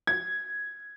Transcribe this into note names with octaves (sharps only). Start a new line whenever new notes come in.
G#6